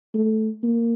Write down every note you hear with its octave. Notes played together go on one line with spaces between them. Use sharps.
A3
A#3